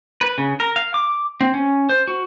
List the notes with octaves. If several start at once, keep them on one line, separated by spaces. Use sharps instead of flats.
B4
C#3
A#4
F5
D6
C4
C#4
C5
F#4